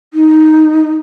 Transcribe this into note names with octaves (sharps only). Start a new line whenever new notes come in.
D#4